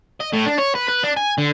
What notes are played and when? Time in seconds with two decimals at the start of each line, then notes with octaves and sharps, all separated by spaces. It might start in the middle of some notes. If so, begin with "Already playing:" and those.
0.21 D#5
0.33 A2
0.46 D4
0.58 C#5
0.75 B4
0.88 B4
1.03 D4
1.16 G#5
1.38 D3